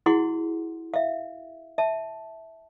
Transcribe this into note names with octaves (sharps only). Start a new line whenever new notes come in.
E4 F#4 G#4 F#5 C6
E5 F5
E5 A5